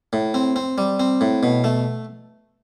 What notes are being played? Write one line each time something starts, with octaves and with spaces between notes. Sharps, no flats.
A2
C4
C4
G3
C4
A2
B2
A3